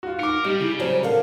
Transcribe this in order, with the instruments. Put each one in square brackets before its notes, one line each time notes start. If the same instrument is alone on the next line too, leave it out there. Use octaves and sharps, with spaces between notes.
[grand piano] F4 F#4
[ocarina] D#4 [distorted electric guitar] A#4 [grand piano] D6 C#7
[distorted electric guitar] G3 [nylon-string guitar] D#4 [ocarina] G4
[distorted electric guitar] C#3 [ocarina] E4
[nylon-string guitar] F#3 G3 C4 [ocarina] C5
[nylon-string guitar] D3 F5 [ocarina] A#4